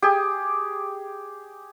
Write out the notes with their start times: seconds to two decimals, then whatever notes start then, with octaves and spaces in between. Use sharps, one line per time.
0.02 G4 G#4